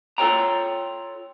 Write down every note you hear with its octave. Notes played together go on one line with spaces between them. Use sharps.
F4 A4 B4 C#5 G5 A#5